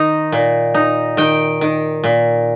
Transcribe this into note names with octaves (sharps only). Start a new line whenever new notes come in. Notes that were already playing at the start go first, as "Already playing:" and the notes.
Already playing: D#3 D#4
A#2
D#4
D#3 G5
D#3
A#2